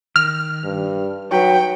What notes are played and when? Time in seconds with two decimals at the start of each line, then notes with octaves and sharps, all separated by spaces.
0.16 D#3 F6
0.65 G2
1.31 F#3 D#4 F#4 B4 G5